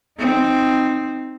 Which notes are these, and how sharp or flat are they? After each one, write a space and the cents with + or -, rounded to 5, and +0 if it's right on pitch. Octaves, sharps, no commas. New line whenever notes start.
C4 +0 D#4 -5